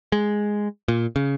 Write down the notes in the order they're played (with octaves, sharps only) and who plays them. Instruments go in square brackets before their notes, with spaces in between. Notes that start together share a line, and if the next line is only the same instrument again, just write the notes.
[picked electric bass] G#3
A#2
C#3